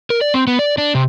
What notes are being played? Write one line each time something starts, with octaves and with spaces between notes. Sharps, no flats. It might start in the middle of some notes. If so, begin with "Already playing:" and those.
A#4
D5
C4
B3
D5
D4
C3